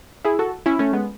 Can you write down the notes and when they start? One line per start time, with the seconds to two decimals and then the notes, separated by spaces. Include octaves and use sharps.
0.24 E4 G#4
0.39 F#4 A4
0.66 C#4 E4
0.79 A3 C#4
0.93 G#3 B3